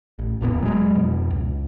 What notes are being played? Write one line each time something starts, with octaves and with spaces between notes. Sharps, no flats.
A1
D1 E2 A#2 B3
F#3 G#3
F2 B2
C#2